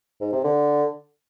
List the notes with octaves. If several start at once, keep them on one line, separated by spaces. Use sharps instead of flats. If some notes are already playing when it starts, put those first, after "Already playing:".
G#2
C3
D3